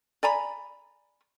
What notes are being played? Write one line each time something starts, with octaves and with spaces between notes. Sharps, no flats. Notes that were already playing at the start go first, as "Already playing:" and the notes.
D5 G#5 A#5 B5